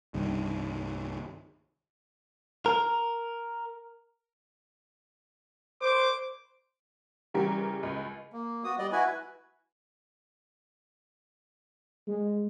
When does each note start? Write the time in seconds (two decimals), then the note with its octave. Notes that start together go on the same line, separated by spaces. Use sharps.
0.14 C2 G2 D#3
2.66 A#4
5.82 C5 D6
7.34 C#3 E3 G3 G4 A#4
7.83 C#2
8.33 A#3
8.64 B3 F#4 D#6
8.79 G3 D5 D#5
8.92 E4 F#4 B4 G#5
12.07 G#3